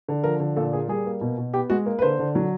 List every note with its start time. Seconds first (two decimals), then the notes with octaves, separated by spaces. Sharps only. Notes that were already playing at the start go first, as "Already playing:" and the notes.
0.08 D3
0.24 F3 A#4
0.40 D3
0.56 A#2 A4
0.73 A#3 G#4
0.88 G3 G#4
1.06 A#3
1.21 B2
1.37 B2
1.54 B3 G4
1.70 G#3 F#4
1.86 A#3
1.99 B4
2.02 D3 C5
2.19 D3
2.35 F#3